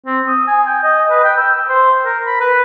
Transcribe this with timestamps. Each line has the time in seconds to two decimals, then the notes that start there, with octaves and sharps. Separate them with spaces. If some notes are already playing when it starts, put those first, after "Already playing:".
0.06 C4
0.28 D#6
0.47 G#5
0.66 G5
0.83 D#5
1.10 B4
1.24 G5
1.38 E6
1.69 C5
2.05 A#4
2.27 B5
2.41 B4